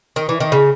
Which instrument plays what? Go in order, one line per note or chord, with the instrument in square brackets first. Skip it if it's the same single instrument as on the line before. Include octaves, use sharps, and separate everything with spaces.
[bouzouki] D#3
E3
D#3
C#3